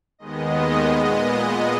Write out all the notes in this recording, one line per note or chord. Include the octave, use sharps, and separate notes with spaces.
D#2 D#3 G#3 B3 D#5
A#2 G#3 B3